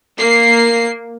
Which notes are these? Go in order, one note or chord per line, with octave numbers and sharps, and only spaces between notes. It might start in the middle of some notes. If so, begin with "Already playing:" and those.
A#3 C7